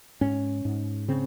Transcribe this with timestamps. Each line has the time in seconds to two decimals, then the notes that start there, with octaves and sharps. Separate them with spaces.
0.21 G#2 C#4
0.65 G#2
1.08 C#3 C4